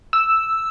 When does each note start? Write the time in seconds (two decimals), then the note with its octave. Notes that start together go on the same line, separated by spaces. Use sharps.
0.13 E6